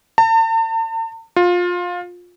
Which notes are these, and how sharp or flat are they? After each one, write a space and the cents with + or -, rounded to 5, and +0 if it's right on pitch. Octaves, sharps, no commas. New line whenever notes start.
A5 +45
F4 +20